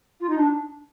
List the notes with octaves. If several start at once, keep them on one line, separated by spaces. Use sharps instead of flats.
F4
D#4
D4